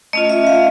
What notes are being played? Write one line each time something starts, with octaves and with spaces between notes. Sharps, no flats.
A3 C#4 F4 D#5
E5
F5